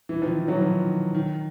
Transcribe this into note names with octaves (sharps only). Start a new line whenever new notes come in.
E3
D#3 F3
E3
E3 F#3
D#3 F3
D#3
D#3